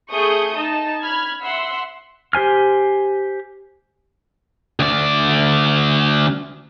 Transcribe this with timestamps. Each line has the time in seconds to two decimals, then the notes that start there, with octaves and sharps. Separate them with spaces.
0.12 A3 G#4 C#6 D#6 G6
0.56 D#4 A5
1.02 B5 F6 G#6
1.43 E5 F#5 C6 E6
2.33 G4 C5 G#5 F6
4.80 D2 D5